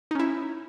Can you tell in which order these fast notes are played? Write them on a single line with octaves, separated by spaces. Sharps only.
D#4 C#4 E4